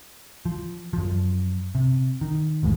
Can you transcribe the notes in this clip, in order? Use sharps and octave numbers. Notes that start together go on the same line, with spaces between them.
F3
F#2 F3
C3
D#3
B1 E2 G#2 G#3